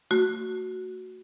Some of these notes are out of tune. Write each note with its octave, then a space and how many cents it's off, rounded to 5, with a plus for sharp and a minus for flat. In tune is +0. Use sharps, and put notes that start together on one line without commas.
A3 +30 F#4 +0